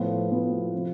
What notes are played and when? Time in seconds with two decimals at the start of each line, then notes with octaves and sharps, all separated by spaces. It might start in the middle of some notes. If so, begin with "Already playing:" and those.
Already playing: A2 F3 B3 F4 B4
0.30 A2 F3 B3 F4 B4
0.74 C3 F3